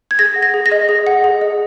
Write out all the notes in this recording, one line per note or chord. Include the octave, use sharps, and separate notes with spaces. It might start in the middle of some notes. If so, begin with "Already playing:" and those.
G#6
G#4 A#6
F#5
A#6
G#4
A#6
D#5
G#4
F#5
G#4
D#5